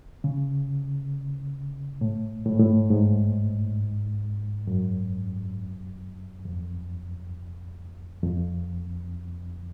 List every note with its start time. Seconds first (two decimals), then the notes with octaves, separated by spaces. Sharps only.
0.24 C#3
2.01 A2
2.46 A2
2.53 G#2
2.60 A2
2.90 G#2
4.67 F#2
6.45 F2
8.23 F2